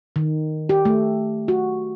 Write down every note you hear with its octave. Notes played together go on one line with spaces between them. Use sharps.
D#3
G4
A3
F#4